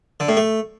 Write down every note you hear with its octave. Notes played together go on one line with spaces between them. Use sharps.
D3
A2
A3